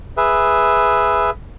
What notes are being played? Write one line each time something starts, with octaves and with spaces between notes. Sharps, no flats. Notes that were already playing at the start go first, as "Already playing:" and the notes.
G#4 B4 E5